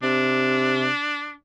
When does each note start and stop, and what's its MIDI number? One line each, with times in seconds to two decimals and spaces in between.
0.03 0.89 48
0.03 1.33 62